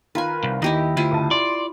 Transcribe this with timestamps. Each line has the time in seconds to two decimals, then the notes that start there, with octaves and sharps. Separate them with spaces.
0.15 D#3 F4 A#4 B4 G#5
0.43 C2
0.62 D#2 D#4 E4 G4 D#5
0.97 D2 E4 F4 D#7
1.12 C#2 A5
1.31 D5 C6